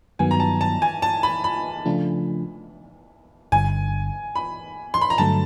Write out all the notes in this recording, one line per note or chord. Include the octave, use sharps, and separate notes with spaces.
G2 D#3 F#3 B3 G#5
A#5
A5
A5
G#5
A5
B5
B5
C#3 F3 A3 D4 F4
G1 G2 D3 G#5
B5
C6
B5
A#5
G2 D3 F#3 A3 A5